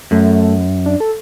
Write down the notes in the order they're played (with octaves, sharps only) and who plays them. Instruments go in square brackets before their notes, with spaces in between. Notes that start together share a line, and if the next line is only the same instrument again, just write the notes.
[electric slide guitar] F#2 [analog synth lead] A3
[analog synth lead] D4
A4